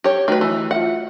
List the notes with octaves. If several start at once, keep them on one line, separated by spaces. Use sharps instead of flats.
G4 C#5
D#3 A3 F#4 B4
E3
F4 E5 F#5